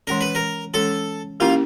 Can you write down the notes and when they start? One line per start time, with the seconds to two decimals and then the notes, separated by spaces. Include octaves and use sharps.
0.07 E3 G#3 C#4 A#4
0.21 B4
0.35 A#4
0.74 E3 G#3 C#4 A4
1.40 A#3 C#4 E4 F4 G4 A#4